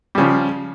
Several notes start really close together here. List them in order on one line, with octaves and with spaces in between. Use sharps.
G3 C#3 F3